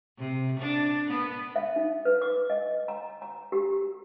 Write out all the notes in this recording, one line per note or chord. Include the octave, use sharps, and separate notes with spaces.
C3
D4
B3
E5
D#4
B4
D6
D#5
A#5
A#5
G4